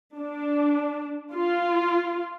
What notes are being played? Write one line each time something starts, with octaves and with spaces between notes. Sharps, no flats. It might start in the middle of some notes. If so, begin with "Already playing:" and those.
D4
F4